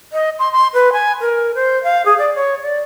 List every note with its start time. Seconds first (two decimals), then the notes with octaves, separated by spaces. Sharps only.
0.13 D#5
0.39 C6
0.52 C6
0.74 B4
0.93 G#5
1.21 A#4
1.55 C5
1.83 F5
2.06 G#4
2.19 D5
2.35 C#5
2.62 D5